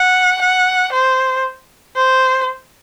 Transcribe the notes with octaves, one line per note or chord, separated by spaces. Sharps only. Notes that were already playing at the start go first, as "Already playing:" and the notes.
Already playing: F#5
F#5
C5
C5